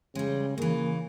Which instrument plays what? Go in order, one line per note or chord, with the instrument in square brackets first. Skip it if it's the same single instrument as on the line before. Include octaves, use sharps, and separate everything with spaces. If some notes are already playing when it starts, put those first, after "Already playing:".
[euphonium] C#3 [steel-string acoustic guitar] G3 G#3
[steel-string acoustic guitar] C#3 E3 [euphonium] A#3